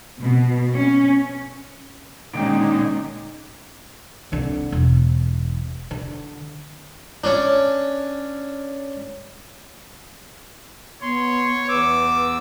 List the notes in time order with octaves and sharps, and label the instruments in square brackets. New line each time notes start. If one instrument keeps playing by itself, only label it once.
[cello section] B2
C#4
[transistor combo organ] A#2 D3 D#3 [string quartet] G#3 [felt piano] C#4 G5 D7 [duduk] D#4
[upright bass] C2 D3
E1
D3
[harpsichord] C#4 D4
[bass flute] B3 [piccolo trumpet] C#5 [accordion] C6
[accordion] E2 E6 [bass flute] B4 [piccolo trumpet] D6